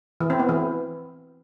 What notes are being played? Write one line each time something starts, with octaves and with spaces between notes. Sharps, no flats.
E3
C4
B3
E3